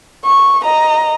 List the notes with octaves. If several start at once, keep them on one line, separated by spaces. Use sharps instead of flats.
C#6
D#5 A#5